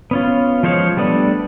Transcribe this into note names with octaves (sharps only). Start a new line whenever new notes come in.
B3 C#4 F4
F3 G#3 C5 C#5 F5
G3 A3 B3 D4